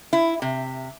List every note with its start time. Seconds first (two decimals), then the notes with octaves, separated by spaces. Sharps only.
0.13 E4
0.42 C3